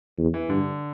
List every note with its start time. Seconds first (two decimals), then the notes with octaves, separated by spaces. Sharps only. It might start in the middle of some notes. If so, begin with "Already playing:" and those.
0.18 E2
0.34 E3
0.49 G2 D3